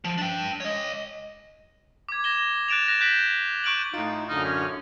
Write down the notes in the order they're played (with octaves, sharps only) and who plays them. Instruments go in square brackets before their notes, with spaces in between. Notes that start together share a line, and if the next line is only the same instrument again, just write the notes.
[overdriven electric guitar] F3
D4 G5
C#5 D#5
[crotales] D6 G#6
G#6 A#6 E7 G7
F#6 A6 D7 E7 F7
F#6 A#6 E7 F7
F#6 G6 B6 D7 E7 F#7
C#6 F#6 D7 E7 F#7
[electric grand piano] A2 F4 [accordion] D#4
[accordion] F#2 D3 F6 [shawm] D#4
[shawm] C#4